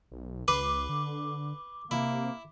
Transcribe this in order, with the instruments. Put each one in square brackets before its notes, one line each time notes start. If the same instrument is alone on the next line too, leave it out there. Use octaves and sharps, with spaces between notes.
[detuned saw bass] B1
[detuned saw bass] C#2 [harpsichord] B4 [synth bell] D6
[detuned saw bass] D3
[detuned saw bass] C3 [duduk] A#3 [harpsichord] E4